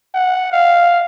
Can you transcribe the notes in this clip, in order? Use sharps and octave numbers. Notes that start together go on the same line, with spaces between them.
F#5
F5